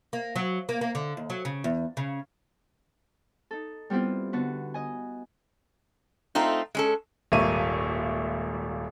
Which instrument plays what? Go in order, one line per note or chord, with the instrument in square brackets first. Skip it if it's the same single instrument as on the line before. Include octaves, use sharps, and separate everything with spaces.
[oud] A#3
F#3
A#3
A#3
D3
D#2
F#3
C#3
E2
C#3
[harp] D#4 A4
G3 B3 C4 E4 F4
D3 B3 F#4 B4
D#5 G#5
[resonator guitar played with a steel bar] A3 C4 D#4 F4
G#3 C#4 A4
[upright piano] D#1 G#1 A#3 E5 C#6 D#7